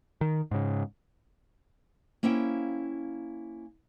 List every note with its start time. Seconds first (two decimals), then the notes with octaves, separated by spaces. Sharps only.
0.21 D#3
0.51 G#2 C#3
2.23 A#3 C#4 E4 C5 F5 G5